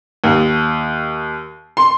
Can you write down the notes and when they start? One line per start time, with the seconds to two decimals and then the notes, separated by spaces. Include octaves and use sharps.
0.24 D#2
1.77 C6